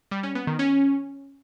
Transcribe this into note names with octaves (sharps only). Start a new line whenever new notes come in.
G3
C#4
B3
D#3
C#4